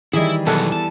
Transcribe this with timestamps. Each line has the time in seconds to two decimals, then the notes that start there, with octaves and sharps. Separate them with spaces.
0.13 D#3 E3 G3 E4 G#4 D#5
0.46 E2 B2 F#3 A4 F#6
0.72 A5